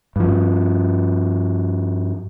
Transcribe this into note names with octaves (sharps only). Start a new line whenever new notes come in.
G2 F3